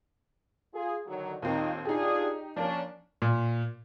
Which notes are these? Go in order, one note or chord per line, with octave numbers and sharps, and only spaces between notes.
F4 G#4
D3 D#3 F#3
D#2 A#2 D#3 C4
D4 D#4 F4 G4 G#4
F3 A#3 C#4 D4
A#2